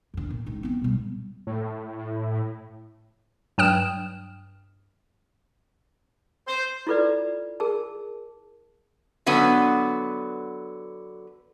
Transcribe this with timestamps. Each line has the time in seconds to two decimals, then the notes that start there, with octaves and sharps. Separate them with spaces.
0.14 F2 D3
0.30 A#2
0.46 C#2 D#3
0.63 B3 C4
0.82 B2 G3
1.47 A2
3.58 G2 F#3 G5 D#6 F6 E7
6.47 C5
6.87 E4 F4 A4 B4 D5
7.60 G#4 A#4 A5
9.26 D3 F#3 B3 B4